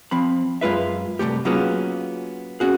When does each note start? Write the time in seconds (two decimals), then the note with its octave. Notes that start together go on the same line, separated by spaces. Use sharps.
0.11 F3 C4 B5
0.61 F#2 G#3 F4 B4 E5
1.19 C2 C3 A3 G4
1.45 F#3 A#3 B3 C#4 F4 G#4
2.60 C#4 F#4 G#4